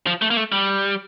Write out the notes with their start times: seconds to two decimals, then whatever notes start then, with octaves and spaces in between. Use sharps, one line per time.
0.07 F3
0.22 A3
0.31 A#3
0.37 A3
0.52 G3